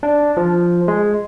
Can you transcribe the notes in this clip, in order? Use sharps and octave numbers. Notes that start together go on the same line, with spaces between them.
D4
F3
G#3